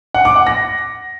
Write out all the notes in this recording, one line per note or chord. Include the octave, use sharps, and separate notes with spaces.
F#5
D6
F#5
A#6